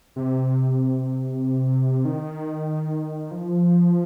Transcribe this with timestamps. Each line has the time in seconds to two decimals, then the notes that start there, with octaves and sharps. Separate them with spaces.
0.16 C3
2.05 D#3
3.31 F3